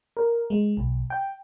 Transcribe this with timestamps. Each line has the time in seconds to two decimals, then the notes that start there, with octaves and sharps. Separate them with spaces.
0.17 A#4
0.50 G#3
0.77 B1
1.10 G5